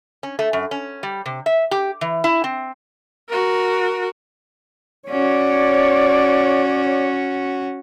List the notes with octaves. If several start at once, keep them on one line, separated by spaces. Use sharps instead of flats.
C#4
A3
F#2
C#4
G3
C3
E5
G4
E3
E4
C4
F#4 A#4
C#4 F#4 C#5 D5